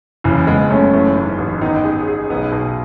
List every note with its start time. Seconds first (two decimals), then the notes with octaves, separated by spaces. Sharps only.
0.24 F#1 C#3 E3
0.47 F#1 G#3 B3
0.70 F#2 A3 C#4
0.93 E3 A3 C#4
1.16 G#2
1.38 A1
1.61 D#3 B3 D#4
1.84 G#4
2.08 G#4
2.30 B1 B3 D#4
2.52 B2